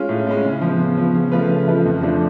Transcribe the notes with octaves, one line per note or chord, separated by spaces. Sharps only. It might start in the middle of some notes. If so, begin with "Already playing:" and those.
Already playing: G#3 C#4 F4
A2
G#3 C#4 F4
C#3
F3 B3
C#3
F3 B3
C#3
F3 A3 F4 B4
C#3
F3 A3 F4 B4
F2
F3 A3 D4